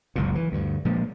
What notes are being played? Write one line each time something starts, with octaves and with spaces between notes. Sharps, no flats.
F#1 C#2 A#2
E3
D2 G2
A#2 F3 G#3